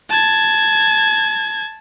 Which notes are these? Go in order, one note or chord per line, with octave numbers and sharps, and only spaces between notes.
A5 G#6